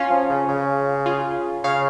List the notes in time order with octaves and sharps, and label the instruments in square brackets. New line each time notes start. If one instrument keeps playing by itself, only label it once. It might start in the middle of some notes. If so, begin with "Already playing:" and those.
Already playing: [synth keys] C#4 F4
[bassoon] F3
C#3
C#3
[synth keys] F4 G#4
[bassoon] C#3 [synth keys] C#5 F5